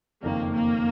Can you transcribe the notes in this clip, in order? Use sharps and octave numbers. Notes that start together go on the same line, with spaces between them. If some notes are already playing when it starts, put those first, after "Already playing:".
F#1 F2 D#3 A#3
A#3